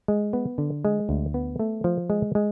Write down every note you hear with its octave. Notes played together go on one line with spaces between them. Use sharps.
G#3
B3
D3
G#3
D2
B3
A3
F3
G#3
G#3